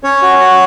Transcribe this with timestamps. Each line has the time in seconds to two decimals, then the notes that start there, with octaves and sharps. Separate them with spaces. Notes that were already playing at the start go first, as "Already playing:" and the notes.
0.04 C#4 C#5
0.22 F#4
0.39 F#4